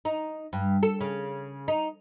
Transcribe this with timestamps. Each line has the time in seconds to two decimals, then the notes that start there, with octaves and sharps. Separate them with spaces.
0.05 D#4
0.53 G2
0.83 A4
1.01 C#3
1.68 D#4